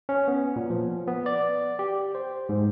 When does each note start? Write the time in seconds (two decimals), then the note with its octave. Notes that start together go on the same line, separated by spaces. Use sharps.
0.09 C#4
0.28 B3
0.56 A#2
0.70 F3
1.08 B3
1.26 D5
1.79 G4
2.15 C5
2.49 G#2